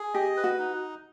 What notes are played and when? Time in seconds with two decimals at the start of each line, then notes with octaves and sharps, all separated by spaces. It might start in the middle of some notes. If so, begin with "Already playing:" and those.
Already playing: G#4
0.14 G4 D#5
0.37 B4
0.44 F#4
0.59 D#4